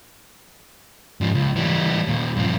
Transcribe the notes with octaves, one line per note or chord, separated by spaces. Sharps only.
G#2 F3
C#2
E3 G3
D#2 A#2
G2 F3